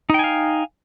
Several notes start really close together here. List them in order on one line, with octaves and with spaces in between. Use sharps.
D#4 G5 G#5 F5